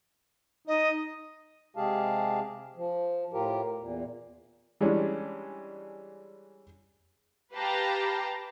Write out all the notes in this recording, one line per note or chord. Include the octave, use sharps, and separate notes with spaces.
D#4 D#5
C3 G#3 G4 G#4 F5 A5
F3
A2 F4 G4 A#4
E2 A#2
E3 G3 G#3 C#4 D4
G4 B4 F5 G5 A5 A#5